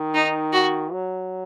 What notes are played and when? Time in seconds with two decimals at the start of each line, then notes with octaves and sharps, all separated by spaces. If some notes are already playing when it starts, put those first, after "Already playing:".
Already playing: D#3
0.14 D#4
0.53 F#4
0.92 F#3